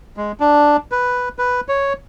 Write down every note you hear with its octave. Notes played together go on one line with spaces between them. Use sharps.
G#3
D4
B4
B4
C#5